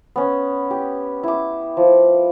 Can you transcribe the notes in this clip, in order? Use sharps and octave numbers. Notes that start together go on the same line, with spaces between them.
B3 C#4
G4
E4 D6
F3